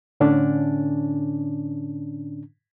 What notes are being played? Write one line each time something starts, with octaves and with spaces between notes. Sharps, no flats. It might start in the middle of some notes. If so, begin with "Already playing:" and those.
A2 D3 C#4 D4